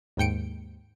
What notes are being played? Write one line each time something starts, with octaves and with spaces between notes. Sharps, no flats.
D#2 G#2 G5 C#7 D7